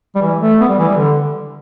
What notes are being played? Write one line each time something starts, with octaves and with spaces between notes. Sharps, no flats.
G3
E3
A3
B3
G3
E3
G3
D3